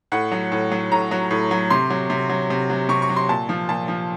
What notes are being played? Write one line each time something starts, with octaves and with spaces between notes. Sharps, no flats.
A2 F#5
F#3
A2
F#3
A2 A#5
F#3
A2
F#3
C3 C6
F#3
C3
F#3
C3
F#3
C3 C#6
C#6
F#3
C6
A#2 A5
F3
A#2 A5
F3